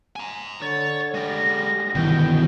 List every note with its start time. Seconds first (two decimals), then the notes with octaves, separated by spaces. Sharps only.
0.16 G#5 A#5
0.62 D3 C#5 A6
1.14 G#3 G4 A#6
1.95 G1 B2 D#3 E3 G5